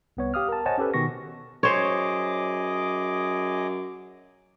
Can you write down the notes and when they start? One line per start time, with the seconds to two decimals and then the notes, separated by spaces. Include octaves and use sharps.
0.17 C2 B3 C#5
0.34 G4 F5 D#6 F6
0.49 A#4 A5
0.66 C5 C#5 D#5 F#5 G#5 A5
0.78 C#4 G4 A4 B4
0.94 B2 D#3 B3 C#6 A#6
1.63 F#2 G#4 C5 C#5 D#5 D6